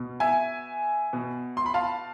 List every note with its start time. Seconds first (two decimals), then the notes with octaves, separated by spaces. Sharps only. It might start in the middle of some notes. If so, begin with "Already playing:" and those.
Already playing: B2
0.20 E5 G#5
1.13 B2
1.57 C6
1.66 B5
1.74 F5 A5